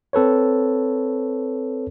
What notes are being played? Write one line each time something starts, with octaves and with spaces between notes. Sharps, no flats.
C4 A4 B4 C#5